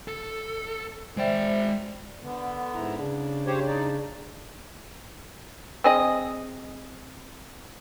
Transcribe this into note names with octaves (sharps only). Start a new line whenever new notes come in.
A4
G#3 C5 D5 E5 G5
D3 B3
G#2 E4 A#5
C#3 D4
G4 C5 C#5
D#4 D5
C4 G#4 D#5